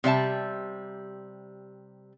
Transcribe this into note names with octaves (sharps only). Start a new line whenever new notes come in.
C3 G3 E5 A5